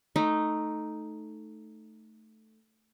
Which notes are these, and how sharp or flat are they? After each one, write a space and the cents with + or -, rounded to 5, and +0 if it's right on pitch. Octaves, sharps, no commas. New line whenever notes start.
A3 +0 D#4 +0